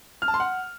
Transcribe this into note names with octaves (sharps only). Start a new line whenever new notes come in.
F6
A5
C6
F#5